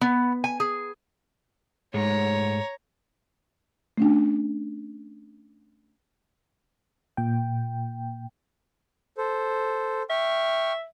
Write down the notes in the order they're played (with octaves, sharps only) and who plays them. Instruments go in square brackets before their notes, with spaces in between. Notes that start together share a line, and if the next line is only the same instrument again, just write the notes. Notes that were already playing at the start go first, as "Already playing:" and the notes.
[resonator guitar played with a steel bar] B3
G#5
G#4
[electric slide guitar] G#2 G#3 A3 [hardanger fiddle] C#5 A#5
[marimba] A3 C#4 D4
[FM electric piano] A#2 G5
[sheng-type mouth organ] A4 C5
[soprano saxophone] E5 [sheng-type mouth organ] G5 C#6 F6